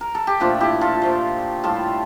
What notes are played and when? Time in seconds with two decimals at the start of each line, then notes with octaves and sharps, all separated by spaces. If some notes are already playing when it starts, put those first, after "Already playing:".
0.01 A#4
0.15 A4
0.27 G4
0.40 A#2 F3 A3 D4 F4
0.60 E4 G4
0.81 F4 A4
1.02 A#2 F3 A3
1.64 A2 G3 F4 A4